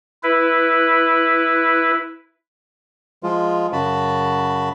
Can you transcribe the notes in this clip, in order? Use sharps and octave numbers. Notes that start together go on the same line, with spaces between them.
E4 B4
F3 G#3 F4
F#2 C#3 F#4 A5 B5